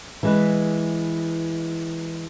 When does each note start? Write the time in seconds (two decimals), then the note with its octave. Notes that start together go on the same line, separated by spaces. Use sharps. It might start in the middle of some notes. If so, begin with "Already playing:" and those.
0.23 E3 G#3 B4